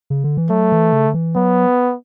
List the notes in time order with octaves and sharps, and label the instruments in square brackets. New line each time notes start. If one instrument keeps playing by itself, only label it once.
[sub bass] C#3
D3
E3
[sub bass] F#3 [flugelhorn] A3
[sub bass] E3
C#3
D3
E3
[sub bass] F#3 [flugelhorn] B3